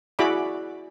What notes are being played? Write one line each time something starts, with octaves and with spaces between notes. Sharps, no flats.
E4 F#4 G#4 D5 B5 D6